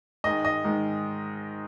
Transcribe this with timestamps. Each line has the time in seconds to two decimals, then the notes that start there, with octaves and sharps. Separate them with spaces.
0.24 G#2 D#3 G#3 D#5
0.45 D#5
0.65 G#2 D#3 G#3